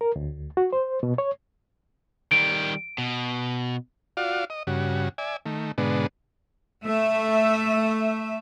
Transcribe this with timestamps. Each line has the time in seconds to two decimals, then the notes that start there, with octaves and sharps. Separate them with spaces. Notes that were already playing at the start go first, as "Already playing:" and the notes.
0.01 A#4
0.16 D2
0.57 F#4
0.73 C5
1.03 B2
1.18 C#5
2.32 D#3 G3 D7
2.98 B2
4.17 F4 F#4 D5 F5
4.50 D#5
4.67 G2 C#3 F#4
5.18 D5 E5 G#5
5.46 D#3 A3
5.78 G#2 B2 D3 G#3 B3 D4
6.84 A3 E5